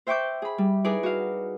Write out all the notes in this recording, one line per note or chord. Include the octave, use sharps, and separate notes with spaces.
C5 E5 G5 C#6 D6 G6
G#4 B5
G3
D#4 E4 G#4 B4 D5
F#4 F5